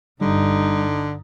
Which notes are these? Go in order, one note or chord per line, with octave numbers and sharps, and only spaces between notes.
G1 G2 D3 G3 D#4